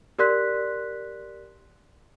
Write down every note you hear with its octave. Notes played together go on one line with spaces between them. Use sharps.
G4 A#4 D5 C6 F#6 B6